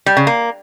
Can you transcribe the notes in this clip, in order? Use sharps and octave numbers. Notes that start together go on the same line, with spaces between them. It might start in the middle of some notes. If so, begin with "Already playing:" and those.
G3
C#3
A#3